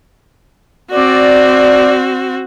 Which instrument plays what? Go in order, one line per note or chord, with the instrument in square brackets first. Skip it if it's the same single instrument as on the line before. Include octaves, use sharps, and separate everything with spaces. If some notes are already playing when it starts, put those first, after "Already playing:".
[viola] C4 F#4 [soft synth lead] D5